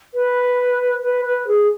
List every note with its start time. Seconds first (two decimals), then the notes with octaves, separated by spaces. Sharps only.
0.14 B4
1.02 B4
1.24 B4
1.47 G#4